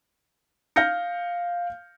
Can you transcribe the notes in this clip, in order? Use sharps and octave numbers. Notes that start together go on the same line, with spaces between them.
F5 F6 G6 A#6 C#7